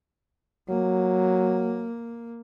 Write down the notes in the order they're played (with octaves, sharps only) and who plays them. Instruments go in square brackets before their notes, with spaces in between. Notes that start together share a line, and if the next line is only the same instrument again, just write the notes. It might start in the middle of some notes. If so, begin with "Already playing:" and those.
[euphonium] F#3 [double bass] A#3